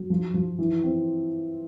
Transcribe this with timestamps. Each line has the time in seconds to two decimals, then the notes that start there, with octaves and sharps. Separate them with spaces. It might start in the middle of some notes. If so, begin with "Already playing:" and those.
Already playing: F#3
0.10 F3
0.34 F3
0.59 E3
0.83 C4